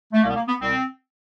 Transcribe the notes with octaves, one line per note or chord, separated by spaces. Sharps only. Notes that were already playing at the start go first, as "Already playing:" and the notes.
A3
C2 B2 G3 A#3
B3
A#3
B3
C2 B2 G3 C4